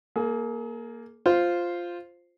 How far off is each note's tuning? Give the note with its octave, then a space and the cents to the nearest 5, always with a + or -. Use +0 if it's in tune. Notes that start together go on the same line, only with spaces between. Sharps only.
A#3 +0 G#4 +40
F4 +0 C5 +0